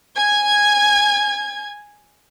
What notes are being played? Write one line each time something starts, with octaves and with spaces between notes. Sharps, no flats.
G#5 G#6